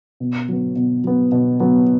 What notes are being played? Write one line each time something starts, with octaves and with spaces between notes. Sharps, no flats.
B2
F#3 B3
B2
F#3 B3
B2
F#3 B3